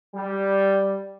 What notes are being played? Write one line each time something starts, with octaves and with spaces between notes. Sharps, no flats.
G3